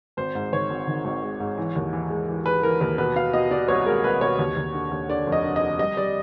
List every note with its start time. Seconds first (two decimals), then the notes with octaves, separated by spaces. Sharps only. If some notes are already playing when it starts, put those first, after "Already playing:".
0.17 G#1 C5
0.35 G#2
0.52 D#3 C#5
0.70 G#1
0.88 D#3
1.05 G#1
1.22 G#3
1.40 G#2
1.58 E3
1.75 D#2
1.93 E3
2.10 G#3
2.28 E3
2.46 G#3 B4
2.63 E3 A#4
2.80 D#2 A#4
2.98 B2 B4
3.16 B2 F5
3.33 B2 D#5
3.51 B2 D5
3.68 C2 C#5
3.86 G#3 A#4
4.04 C2 B4
4.21 B2 C#5
4.39 D#2
4.57 D#2
4.74 D3
4.91 D#2
5.09 D3 D5
5.27 F1
5.32 D#5
5.44 D3
5.56 D#5
5.62 D3
5.79 G3 D#5
5.97 G3 D5